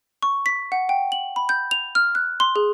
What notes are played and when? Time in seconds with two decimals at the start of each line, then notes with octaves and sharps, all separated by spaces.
0.22 C#6
0.46 B6
0.72 F#5
0.89 G5
1.12 F#7
1.36 B5
1.49 G6
1.71 F7
1.95 F6
2.15 F#6
2.40 C6
2.56 G#4